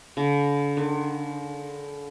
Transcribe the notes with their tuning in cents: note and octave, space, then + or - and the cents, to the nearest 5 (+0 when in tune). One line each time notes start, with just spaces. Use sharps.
D3 -40
D3 +40